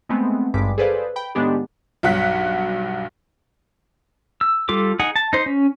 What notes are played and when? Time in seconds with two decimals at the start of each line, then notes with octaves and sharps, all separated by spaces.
0.09 G#3 A3 B3 C4
0.54 G#1 G2 G3 G#3 D6 B6
0.78 G#4 A4 B4 C5 D5 F5
1.16 G5 B5
1.35 A2 D#3 G#3 B3 D4 G4
2.03 B1 G2 F#3 F#5 F#6 B6
4.41 E6
4.69 G3 F4 A4 D6
4.99 D#4 G#4 F#5
5.16 A5
5.33 D#4 C5
5.46 C#4